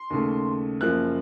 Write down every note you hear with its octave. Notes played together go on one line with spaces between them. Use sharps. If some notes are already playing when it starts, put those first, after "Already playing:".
Already playing: C6
D#2 C#3 A3
F#1 F#2 F3 A#3 F#6